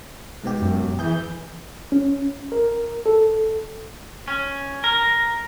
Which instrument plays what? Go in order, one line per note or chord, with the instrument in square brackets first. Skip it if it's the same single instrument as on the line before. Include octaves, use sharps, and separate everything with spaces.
[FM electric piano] G#2 B2 G4
[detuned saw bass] F#2
[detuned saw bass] E3 [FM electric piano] G#4 G6
[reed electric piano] C#4
A#4
A4
[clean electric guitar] C#4
A#4